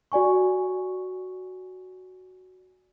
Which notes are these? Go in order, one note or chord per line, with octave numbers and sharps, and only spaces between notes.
F#4 D5 G#5 C#6